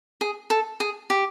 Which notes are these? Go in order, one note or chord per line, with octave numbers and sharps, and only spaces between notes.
G#4
A4
G#4
G4